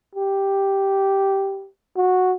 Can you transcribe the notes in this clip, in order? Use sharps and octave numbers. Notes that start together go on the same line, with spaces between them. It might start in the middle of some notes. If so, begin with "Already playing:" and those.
G4
F#4